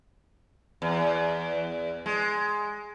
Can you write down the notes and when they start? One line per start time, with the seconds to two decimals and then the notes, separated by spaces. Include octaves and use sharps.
0.82 E2
2.06 G#3